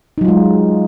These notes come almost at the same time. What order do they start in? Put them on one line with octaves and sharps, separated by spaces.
D#4 F#3 F4 G#3